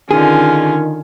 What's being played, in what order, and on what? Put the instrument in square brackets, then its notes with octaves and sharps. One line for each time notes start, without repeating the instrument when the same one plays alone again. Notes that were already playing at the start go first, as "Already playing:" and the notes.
[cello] D3 F4 [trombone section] D#3 [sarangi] C#4 [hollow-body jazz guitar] G#4